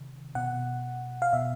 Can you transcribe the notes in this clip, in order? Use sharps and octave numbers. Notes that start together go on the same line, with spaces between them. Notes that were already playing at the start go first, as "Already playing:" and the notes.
Already playing: C3 D#3
B2 F#5
F5
B2 E5